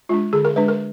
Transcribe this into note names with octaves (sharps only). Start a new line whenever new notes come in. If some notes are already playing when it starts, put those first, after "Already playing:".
G#3 D4 F4
D3 G#4
A#4
G#3 D4 B4
A#4